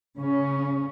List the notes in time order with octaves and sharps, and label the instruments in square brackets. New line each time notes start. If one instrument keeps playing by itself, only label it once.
[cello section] C#3 C#4